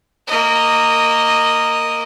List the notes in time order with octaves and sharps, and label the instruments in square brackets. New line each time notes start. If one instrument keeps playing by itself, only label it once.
[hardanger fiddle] A#3 D#5